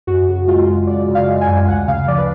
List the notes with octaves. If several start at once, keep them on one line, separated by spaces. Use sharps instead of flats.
F#2 F#4
C#3
G#3 F4
F#2
F#2 D5
C#3
F5
G#3
G#5
F#2
D2 F#5
C#3 F5
F3 D5
B4